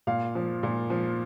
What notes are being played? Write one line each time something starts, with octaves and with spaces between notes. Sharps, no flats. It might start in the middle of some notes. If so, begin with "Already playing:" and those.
A#2 F5
F3
A#2
F3